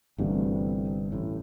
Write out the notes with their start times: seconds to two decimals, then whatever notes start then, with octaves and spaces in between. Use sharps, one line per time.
0.18 G1 G2 C3 E3 A3 C4 F#4
1.12 A1 A2